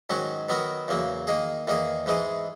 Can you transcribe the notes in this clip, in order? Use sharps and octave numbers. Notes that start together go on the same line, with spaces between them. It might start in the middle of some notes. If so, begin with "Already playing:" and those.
G#2 D#3 F#3 C#4 F#4
D#3 F#3 B3 F#4 A#4
E2 C#3 F#3 A#3
D#3 A#3 D#4 G#4
E2 D#3 A#3 D#4 G#4
G#2 E3 G#3 D#4 G#4